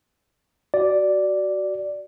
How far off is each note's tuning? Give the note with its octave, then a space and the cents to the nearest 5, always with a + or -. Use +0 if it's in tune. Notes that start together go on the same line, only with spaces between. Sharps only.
F#4 +20 D5 +0